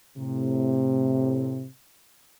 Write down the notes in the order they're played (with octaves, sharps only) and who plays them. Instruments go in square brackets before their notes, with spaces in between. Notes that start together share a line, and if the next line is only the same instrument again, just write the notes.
[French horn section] A2 C3